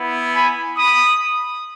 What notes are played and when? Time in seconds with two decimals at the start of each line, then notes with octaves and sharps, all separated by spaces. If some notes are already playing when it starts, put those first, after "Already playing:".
Already playing: B3 E4
0.34 G#5 B5
0.77 B5 D#6